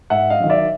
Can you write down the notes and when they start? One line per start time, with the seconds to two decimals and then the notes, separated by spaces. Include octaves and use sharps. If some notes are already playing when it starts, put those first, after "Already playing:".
0.10 G#2 E5 F#5
0.30 D#5 F5
0.40 D#3 F#3
0.50 D5 E5